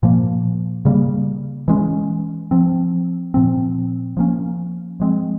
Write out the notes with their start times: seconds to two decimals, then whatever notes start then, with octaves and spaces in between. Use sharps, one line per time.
0.03 A#2 F3 A#3
0.85 C#3 G3 A#3
1.68 E3 G#3 C#4
2.51 F3 C4
3.34 A#2 F3 C4
4.17 F3 A#3 C#4
5.00 F3 G#3 C4